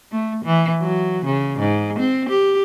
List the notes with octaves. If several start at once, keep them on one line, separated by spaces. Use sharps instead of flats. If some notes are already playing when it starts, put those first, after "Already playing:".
A3
E3
F#3
C#3
G#2
C4
G4